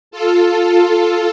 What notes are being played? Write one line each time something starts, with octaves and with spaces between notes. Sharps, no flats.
F4 A4